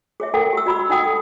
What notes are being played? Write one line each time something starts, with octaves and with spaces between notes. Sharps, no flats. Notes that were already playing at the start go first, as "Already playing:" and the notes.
G#4 C#5 E5
A4 A#4 F#5 G5
G4 E6
F#4 D5 B5 C6 E6
D#4 D5 F#5 G5 D#6
A4